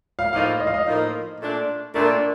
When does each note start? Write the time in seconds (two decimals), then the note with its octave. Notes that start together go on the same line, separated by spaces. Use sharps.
0.19 F5
0.33 A2 F3 A#3 D#4 A#4 F5
0.60 D#5
0.67 F5
0.74 D#5
0.86 A2 F3 A#3 D#4 A#4
1.40 A#2 A3 D4
1.94 A#2 A3 D4 A#4